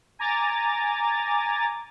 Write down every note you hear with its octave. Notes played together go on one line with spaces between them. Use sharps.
G#5 A#5 D6 A6